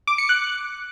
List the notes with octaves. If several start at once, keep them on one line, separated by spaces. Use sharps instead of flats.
D6
C#7
F#6